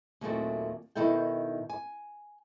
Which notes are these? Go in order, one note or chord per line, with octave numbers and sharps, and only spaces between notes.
D#2 A#2 F#3 G#3 A3 C4
B2 D#3 D#4 E4 A4 G5
G#5